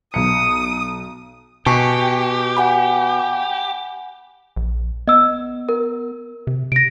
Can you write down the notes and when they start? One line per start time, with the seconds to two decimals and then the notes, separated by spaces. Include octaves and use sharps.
0.14 B1 D#6 C#7
1.66 B2 G4 G#5 A5 C#6
2.57 F#5 G#5 B5
4.56 A#1
5.07 B3 D#5 E6
5.69 A#4
6.47 C3
6.72 C3 A#6 D7